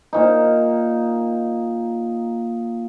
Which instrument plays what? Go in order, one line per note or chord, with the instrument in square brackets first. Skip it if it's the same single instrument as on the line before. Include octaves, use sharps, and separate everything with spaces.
[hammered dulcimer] A#2 D#4